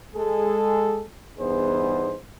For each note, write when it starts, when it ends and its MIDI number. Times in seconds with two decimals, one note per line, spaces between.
0.15 1.02 56
0.15 1.02 68
0.15 1.02 69
1.39 2.15 40
1.39 2.15 43
1.39 2.15 59
1.39 2.15 63
1.39 2.15 68
1.39 2.15 72